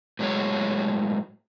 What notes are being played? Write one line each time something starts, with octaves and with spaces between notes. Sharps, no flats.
A2 F#3 G#3 C#5